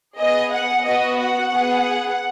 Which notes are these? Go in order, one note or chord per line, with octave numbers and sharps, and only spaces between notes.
B3 G#4 D#5
F#5
B3 F#4 D#5
F#5
B3 G#4